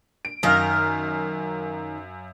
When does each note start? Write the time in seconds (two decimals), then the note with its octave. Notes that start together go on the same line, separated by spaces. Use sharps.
0.25 D7
0.43 F#2 D#3 A#4 F5